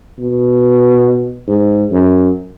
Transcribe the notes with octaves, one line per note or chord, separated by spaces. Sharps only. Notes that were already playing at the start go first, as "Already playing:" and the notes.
B2
G#2
F#2